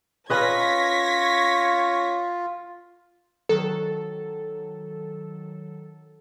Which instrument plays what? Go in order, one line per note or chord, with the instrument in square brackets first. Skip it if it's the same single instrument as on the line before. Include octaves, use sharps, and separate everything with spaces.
[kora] C#4 B4 D#5 [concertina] F4 [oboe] C#5 [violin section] G#6 A#6 B6
[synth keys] D#3 F#3 A4